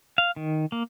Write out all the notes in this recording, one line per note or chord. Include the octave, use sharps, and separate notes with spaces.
F5
D#3
A#3